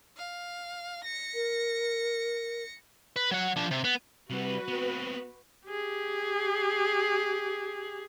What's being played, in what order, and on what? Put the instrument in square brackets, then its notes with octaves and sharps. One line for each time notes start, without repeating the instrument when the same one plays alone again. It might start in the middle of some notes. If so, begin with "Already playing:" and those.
[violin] F5
A#6 C#7
[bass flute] A#4
[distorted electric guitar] B4
F#3 F#5
F3 D4
C3
B3
[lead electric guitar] C3 G3 [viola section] F#4 B4
[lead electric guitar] B3 C4
[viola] G4 G#4